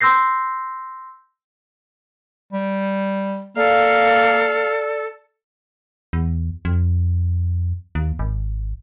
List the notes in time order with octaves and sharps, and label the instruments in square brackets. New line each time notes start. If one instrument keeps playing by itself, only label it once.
[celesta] C6 E6 G6 A#6 C7
[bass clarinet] G3
[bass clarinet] A#3 [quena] A4 [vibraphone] D5 [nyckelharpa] F5
[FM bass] E2
F2
D#2
G#1